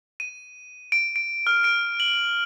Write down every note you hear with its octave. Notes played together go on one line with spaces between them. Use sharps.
D#7
D7
D7
F6
D7
F#7